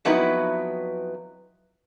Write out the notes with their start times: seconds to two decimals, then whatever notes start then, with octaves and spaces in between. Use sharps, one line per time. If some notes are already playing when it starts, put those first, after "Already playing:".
0.05 F2 F#3 B3 D#4 E4 B4